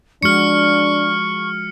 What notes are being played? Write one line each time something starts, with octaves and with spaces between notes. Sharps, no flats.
F3 G#3 D4 F#4 C#6 F6 C#7